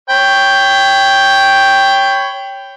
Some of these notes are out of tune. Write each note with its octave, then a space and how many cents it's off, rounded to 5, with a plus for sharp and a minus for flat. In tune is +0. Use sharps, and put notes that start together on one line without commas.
C#5 +0 G5 +0 B5 +35